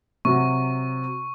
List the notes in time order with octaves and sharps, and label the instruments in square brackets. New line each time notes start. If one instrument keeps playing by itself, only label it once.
[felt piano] C3 F#3 [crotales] C#6